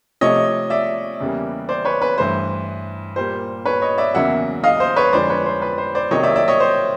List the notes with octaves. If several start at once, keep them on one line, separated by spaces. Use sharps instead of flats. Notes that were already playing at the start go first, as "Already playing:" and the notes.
C3 F3 A3 C#5 D#5
D5 E5
E2 C#3 E3 G3 A#3
C5 D5
B4 C#5
B4
G2 E3 A3 C5
A#2 G3 A#3 C5
B4 C#5
C#5 D#5
D5 E5
E2 C#3 F#3 A#3 E5 F#5
D#5 F5
C5
B4 C#5
F2 D3 F3 G#3 C5 D5
B4 C#5
C5
B4
C5
C5 D5
C3 D#3 F#3 A#3 C#5 D#5
D5 E5
D5 E5
C#5 D#5
C5